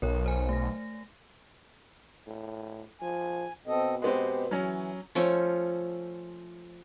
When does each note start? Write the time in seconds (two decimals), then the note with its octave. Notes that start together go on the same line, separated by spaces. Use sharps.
0.02 B1 A#4 C#5
0.26 C5 G#5
0.49 A3 A#6
2.27 A2
3.01 F3 G#5
3.67 B2 C4 A4 D#5
4.02 G#3 B3 C4 G4
4.51 E3 F#3 C#4
5.15 F3 A3 C#4